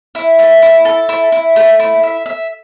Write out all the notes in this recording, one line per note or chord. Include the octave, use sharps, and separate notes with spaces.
E4
A3
E4
A4
E4
E4
A3
E4
E5
E5